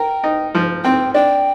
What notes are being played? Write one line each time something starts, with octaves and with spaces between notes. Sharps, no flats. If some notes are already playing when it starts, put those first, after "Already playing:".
Already playing: A#4 G5
D#4
F3
C4 G5
D4 G5